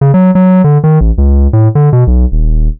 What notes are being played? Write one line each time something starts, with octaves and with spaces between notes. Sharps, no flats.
C#3
F#3
F#3
D3
D#3
A1
C#2
A2
D3
B2
B1
D#1